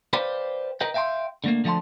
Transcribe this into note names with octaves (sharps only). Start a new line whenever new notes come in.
B4 C5 D5 F5 G5 B5
A#4 B4 D#5 G5
E5 F5 G5 A5 C6
D3 A3 A#3
D3 F3 A3 D#5 A5 C6